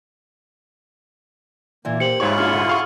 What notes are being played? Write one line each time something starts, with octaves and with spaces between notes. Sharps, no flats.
A#2 E3 A#3
G4 C5 C#7 F#7
G#2 E4 F4 G#4 C#5 C#6
D4 F#4 F5 F6
D3 F#4 D#7
F5 C#6